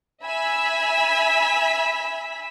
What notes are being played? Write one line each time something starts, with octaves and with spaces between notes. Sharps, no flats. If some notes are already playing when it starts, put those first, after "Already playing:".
E5 G#5 B5 E6 B6